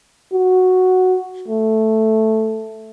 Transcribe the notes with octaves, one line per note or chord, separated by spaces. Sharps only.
F#4
A3